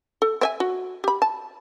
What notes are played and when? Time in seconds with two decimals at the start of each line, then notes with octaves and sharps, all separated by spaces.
0.22 A4
0.41 C4 E5 G#5
0.60 F#4
1.04 G4 B5
1.22 A5